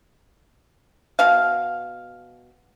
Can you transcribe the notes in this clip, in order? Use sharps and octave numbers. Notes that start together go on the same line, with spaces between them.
B2 F5